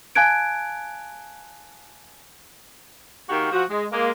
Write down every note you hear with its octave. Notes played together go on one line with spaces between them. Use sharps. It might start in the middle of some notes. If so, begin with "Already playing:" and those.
F5 G#5 A5 F#6 G#6 D7
D#3 A#3 F#4 G4 A#4
F3 F#4
G#3
G#3 A#3